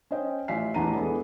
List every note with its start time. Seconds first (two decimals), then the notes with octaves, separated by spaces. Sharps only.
0.11 C#4 C5 D#5 G5
0.48 A1 F4 E5 G#5 B6 C7
0.74 A1 E2 F#5 A5 A#5 D#7
0.94 E3 G#3 B3 D4 G#4 A4